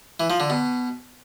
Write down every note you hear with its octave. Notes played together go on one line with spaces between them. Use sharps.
E3
F3
D3
B2